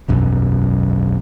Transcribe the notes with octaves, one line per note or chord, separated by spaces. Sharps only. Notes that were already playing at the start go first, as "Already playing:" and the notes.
E1 B1 F#2